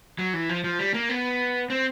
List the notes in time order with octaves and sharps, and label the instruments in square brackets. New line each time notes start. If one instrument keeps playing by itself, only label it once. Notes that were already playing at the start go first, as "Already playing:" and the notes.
[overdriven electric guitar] F#3
E3
F3
F3
G3
A#3
B3
C4